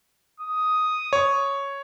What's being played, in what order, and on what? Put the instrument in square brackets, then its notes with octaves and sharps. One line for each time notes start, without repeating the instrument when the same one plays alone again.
[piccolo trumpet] D#6
[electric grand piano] C#5